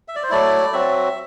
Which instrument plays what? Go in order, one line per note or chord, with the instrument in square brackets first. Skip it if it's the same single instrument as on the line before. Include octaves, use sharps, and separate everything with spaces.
[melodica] E5
D5
C5
F#3 A3 E4 D5
F#3 C4 F#4 E5